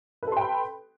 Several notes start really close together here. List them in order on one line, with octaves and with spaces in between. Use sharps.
B4 A4 C6 G5 B5